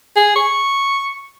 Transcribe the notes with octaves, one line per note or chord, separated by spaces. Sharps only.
G#4
C#6